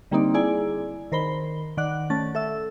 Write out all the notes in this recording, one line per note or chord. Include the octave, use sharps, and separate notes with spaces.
D3 G3 A#3 C4 D#4 D5
E4 G#4 D5 G#5
D#3 A#4 C5 B5 G7
D#3 D5 F#5 F#6
A3 C#4 A6
A4 E5 E6